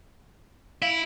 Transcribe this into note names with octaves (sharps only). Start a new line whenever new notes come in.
E4 F5 D7 F7